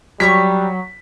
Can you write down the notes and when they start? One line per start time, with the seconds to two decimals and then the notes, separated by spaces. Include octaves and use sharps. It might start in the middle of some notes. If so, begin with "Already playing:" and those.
0.20 F#3 G3 C#5 A#5 C#6 B6